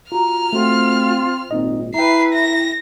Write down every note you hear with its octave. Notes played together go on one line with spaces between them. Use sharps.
F4 F#4 A#5 F6
A3 C4 F4 F#4
G#1 A#2 C4 D#4 D#5
E4 B4 E5 G5 A#5 C7
A#6